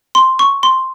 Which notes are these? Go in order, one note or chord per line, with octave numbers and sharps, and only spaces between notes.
C6
C#6
C6